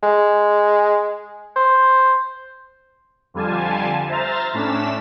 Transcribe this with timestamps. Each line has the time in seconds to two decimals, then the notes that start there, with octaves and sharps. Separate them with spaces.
0.03 G#3
1.56 C5
3.34 F2 D3 G3 F4 G#5 A5
4.09 C5 E5 A#5 F6 A6
4.53 A2 A3 C#4 D4 B6 E7